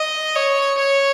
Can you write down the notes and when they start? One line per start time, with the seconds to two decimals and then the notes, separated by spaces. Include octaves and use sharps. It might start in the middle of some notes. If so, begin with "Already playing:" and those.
Already playing: D#5
0.35 C#5
0.78 C#5